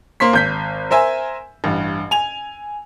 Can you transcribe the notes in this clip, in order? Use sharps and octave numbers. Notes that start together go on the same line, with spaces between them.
A#3 C5 C6 B6
G#1 G6 B6
A#4 C5 E5 G#5
A1 G2
G#5 F7